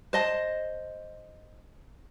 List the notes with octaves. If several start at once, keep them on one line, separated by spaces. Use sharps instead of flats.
C5 D#5 A5